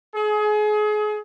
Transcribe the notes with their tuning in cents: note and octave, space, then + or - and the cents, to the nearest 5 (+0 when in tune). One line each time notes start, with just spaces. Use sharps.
G#4 +30